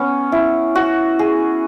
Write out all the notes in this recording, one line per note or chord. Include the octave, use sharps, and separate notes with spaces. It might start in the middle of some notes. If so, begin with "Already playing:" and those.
Already playing: B3 C#4
E4
F#4
G#4